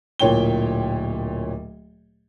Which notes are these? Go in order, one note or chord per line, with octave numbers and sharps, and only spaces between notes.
D1 A#2 C#5 G5 G7